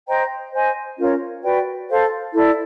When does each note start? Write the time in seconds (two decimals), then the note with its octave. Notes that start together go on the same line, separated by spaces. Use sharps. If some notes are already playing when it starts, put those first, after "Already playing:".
0.07 C5 D#5 G5 A#5
0.53 C5 D#5 G#5
0.98 C#4 F4 A#4 C#5
1.43 F#4 B4 D5 G5
1.89 A4 C5 F5
2.34 E4 A4 D5